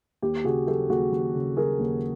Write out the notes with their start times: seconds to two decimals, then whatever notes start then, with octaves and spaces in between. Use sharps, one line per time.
0.22 D#2 G4
0.44 C#3 F#4 G#4
0.67 F#3 G4 A4
0.89 D#2 F#4 G#4
1.12 D#2
1.34 C#3
1.57 F#3 G#4 A#4
1.79 D#2